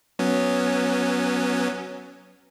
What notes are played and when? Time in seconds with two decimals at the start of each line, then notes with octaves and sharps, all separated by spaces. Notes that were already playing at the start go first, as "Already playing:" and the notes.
0.19 F#3 B3 C#4